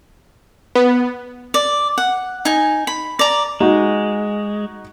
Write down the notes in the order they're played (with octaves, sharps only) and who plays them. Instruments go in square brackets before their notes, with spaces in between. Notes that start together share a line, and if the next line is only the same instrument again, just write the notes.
[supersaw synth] B3
[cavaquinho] D5
F#5
D#4 G#5
B5
D5 A#5
[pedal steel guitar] G#3 [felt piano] D#4 F#4